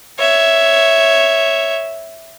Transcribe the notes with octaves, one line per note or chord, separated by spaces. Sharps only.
C#5 E5